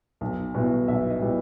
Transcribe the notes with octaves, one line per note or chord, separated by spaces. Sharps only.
B1
B2 G3 B3 E4
B1 E5
D#5
B2 G3 B3 E4